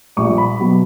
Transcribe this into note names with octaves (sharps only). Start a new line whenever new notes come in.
A#1 A#2 G3 C#6
B5
B2 F#3